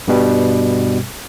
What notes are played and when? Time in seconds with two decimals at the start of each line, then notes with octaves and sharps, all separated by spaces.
0.08 G2 B2 G3